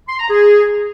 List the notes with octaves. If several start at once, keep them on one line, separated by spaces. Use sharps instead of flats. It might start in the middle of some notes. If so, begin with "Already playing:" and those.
C6
A#5
G#4